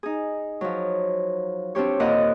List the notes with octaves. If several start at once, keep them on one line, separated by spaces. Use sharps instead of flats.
D#4 G#4
F3 F#3
C4 D4 F4 G4 C#5
D#2 A#2 F4 D#5 F#5